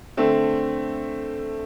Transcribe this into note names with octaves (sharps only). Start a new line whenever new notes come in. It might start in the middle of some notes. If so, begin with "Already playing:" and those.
D3 A3 C4